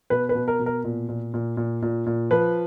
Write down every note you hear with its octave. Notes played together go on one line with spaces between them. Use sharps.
B2 B4
B4
B2
A#4
B2
A#4
A#2
A#2
A#2
A#2
A#2
A#2
F3 B4